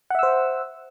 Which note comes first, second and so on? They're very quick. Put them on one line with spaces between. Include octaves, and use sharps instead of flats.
F#5 E5 E6 C5